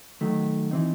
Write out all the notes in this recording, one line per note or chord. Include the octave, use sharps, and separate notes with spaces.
D#3 F#3 A3
E3 C4 D#4